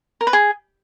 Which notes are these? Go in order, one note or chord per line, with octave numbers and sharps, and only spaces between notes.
A#4
B4
G#4